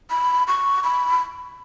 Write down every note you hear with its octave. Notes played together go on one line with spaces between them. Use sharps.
B5
C#6
B5